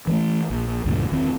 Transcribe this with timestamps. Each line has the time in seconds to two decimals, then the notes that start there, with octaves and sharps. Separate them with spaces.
0.07 E3 G#3 A3
0.50 A#1
0.86 C#2 G2 A#2 E3
1.10 E1 D#3 C4